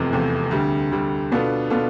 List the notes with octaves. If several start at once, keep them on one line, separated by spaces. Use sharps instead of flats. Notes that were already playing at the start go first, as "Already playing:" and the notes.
Already playing: F1 E2 C3 F3 A3
F1 E2 C3 F3 A3
D2 D3 G3
D2 D3 G3
B2 B3 D4 F4 A4
B2 B3 D4 F4 A4